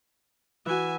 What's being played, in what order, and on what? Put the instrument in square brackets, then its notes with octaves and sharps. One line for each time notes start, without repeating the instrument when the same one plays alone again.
[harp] E3 F#4 [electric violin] E5 G#5